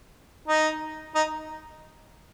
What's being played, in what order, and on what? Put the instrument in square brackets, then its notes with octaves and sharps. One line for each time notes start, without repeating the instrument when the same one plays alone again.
[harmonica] D#4
D#4